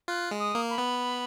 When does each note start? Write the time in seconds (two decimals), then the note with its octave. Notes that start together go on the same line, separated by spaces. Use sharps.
0.08 F4 F#6
0.31 G#3
0.39 D#6
0.55 A#3
0.70 B5
0.78 B3